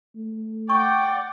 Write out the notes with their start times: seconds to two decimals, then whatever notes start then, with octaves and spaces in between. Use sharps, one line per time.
0.15 A3
0.69 D5 F#5 G5 C#6